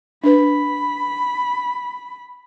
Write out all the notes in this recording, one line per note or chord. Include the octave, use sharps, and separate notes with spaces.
D4 B4 B5